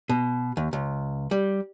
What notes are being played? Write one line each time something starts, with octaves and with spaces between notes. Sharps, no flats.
B2
D#2
C#2
G3